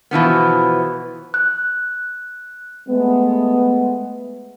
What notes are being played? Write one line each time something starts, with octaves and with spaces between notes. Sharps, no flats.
B2 E3 F3 B3
F#6
G#3 A3 B3